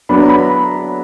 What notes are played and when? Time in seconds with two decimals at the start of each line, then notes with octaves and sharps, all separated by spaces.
0.09 F#3 B3 D4 B5
0.19 A#5
0.29 B5